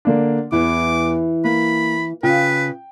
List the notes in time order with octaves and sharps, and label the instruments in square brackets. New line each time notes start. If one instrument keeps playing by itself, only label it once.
[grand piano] D3 A#3 D4
[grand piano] E2 [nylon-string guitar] E3 E4 [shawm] D6
[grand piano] A#3 [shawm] B5
[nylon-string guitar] C#3 F4 [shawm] B4 [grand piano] G5